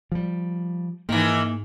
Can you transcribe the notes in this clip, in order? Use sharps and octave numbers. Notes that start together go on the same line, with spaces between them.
F3 G3
G#2 D#3 E3 A#3 D#4